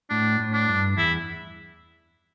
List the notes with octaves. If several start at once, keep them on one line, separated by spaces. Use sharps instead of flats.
A2 D4
A2
D4
G2
E2 E4